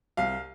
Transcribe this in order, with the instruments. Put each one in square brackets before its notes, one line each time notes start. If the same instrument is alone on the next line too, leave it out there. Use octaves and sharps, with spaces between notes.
[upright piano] C2 F5